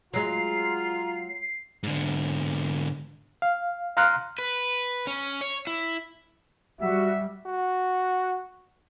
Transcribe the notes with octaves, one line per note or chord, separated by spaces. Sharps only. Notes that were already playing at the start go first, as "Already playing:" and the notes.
F#3 G#3 F4 A#5 C7
G#2 D3
F5
F5 A#5 C6 F6 F#6
B4
C#4
C#5
E4
G3 F#4 E5 F#5
F#4